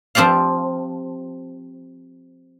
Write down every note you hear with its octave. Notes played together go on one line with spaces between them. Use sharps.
F3 C4 G4 D5 F5